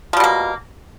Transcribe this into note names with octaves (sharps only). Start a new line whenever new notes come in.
B2 F3 G3 A#3